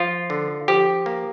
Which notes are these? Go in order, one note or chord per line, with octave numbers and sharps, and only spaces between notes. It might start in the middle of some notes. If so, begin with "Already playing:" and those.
Already playing: F3 F4
D3
F3 G4
A#3